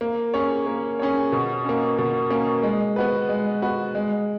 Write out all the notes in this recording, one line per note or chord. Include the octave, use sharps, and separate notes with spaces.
A#3
C#4 G#4 C#5
A#3
C#4 G#4 C#5
B2
A#3 C#4
B2
A#3 C#4
G#3
B3 F#4 B4
G#3
B3 F#4 B4
G#3